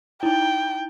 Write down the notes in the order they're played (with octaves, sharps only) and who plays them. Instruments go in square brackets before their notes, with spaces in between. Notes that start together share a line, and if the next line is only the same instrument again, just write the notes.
[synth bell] D#4 E4 [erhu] G5